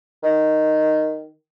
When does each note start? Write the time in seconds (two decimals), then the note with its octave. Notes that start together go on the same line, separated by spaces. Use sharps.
0.23 D#3